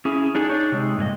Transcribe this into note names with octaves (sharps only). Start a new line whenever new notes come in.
C#4 E4 G#4
D4 D#4 G#4
D4 D#4 C#5
C3 G#3
G2 A#2 G#4 D#5